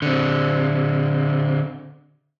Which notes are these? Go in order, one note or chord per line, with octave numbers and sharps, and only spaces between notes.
D3 C4